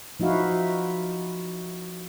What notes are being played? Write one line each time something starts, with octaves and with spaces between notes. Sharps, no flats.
F3 D#4 E4 F#4 F5